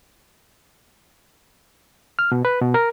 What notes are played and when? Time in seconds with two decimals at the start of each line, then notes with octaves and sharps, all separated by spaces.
2.19 F6
2.32 B2
2.45 B4
2.61 B2
2.74 A#4